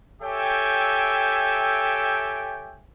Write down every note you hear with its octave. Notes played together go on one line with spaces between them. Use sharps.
G4 A4 C#5 E5 G5 G#5